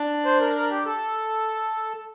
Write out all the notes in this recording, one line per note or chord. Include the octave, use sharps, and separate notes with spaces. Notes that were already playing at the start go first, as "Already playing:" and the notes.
Already playing: D4
C5
A#4
A#4
G4
A4